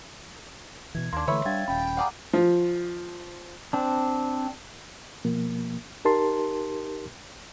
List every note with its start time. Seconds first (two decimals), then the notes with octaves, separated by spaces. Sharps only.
0.95 B2 E3 G#6
1.13 D#2 A#3 D4 C6
1.27 D3 E3 A3 B4 C#5 E5
1.45 G3 D4 F5 G5 G#6 A6
1.68 D#1 C#4 G5 B5
1.97 G#4 D5 F5 F#5 A#5
2.33 F3
3.73 C4 D4
5.25 B2 F3 A#3
6.05 D#4 G4 A#4 A5 C6